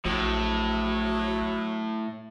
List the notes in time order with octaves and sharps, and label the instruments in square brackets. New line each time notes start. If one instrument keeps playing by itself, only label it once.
[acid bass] A#1 [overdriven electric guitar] A2 [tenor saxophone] F#3